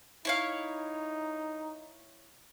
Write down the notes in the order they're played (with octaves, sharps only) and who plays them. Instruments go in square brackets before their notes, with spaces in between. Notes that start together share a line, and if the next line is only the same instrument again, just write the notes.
[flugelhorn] D#4 [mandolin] E4 C#5 F5